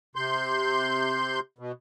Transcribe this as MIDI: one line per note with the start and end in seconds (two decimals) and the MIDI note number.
0.16 1.40 48
0.16 1.40 84
0.16 1.40 91
1.59 1.72 47